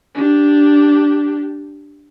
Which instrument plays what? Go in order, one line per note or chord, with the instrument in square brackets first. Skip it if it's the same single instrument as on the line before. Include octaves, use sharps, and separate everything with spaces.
[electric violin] D4 G4